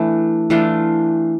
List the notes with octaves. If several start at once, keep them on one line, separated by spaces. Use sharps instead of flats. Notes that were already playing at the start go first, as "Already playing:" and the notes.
Already playing: E3 A3 D4
E3 A3 D4 F4